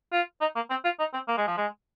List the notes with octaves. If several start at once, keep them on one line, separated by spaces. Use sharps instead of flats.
F4
D#4
A#3
C4
F4
D#4
C4
A#3
G#3
F3
G#3